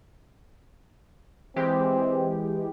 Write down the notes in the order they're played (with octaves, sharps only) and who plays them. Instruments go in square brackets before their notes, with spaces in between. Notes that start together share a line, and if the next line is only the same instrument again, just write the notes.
[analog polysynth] E3 G#3 G4 [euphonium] C4